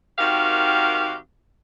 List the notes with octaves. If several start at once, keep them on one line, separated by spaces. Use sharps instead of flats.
D#3 C4 F#4 G4 A#4 F5